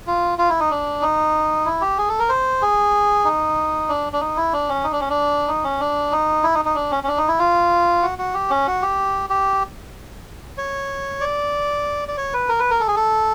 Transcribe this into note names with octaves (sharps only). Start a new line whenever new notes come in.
F4
F4
E4
D#4
D4
D#4
E4
G4
G#4
A4
A#4
C5
G#4
D#4
D4
D4
D#4
E4
D4
C#4
D#4
D4
C#4
D4
D#4
C#4
D4
D#4
E4
D#4
D#4
D4
C#4
C#4
D4
D#4
E4
F4
F#4
F#4
G4
C#4
F#4
G4
G4
C#5
D5
D5
C#5
B4
A#4
B4
A#4
A4
G#4
A4